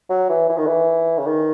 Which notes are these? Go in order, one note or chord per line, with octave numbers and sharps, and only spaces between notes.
F#3
E3
E3
D#3
E3
C#3
D#3